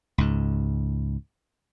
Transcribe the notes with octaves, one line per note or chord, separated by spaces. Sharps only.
C#2 G#2